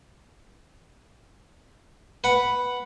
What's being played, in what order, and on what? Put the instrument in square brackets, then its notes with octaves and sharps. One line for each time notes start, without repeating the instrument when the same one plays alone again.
[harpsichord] B4 F#5 B5